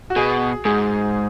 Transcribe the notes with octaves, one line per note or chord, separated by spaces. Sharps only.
F#4
B2 G#4
G#2 G#4